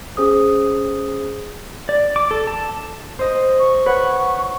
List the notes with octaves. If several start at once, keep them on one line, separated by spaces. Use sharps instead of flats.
C#4 G#4 C5 D#6
D5
D6
A4
A5
C5 D#5
C#6
B4 C#5 F#5